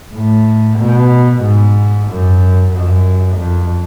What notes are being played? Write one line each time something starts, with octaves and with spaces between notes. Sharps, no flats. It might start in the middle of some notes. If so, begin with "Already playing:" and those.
A2
B2
G#2
F#2
F#2
F2